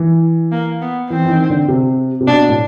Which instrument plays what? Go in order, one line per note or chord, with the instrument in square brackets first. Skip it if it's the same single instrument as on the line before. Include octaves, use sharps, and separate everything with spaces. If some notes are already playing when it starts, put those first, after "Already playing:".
Already playing: [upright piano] E3
[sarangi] A#3
B3
[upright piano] E3 [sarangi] C4
[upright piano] E3
D#3
D3
C3
C3
[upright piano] B2 [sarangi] D4
[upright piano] A2